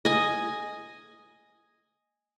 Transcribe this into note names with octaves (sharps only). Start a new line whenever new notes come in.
D#5 G#5